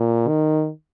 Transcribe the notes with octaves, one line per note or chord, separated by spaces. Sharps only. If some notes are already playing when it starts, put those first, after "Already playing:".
Already playing: A#2
D#3